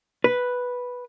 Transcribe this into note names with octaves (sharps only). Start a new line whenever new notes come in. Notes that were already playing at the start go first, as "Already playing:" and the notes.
B4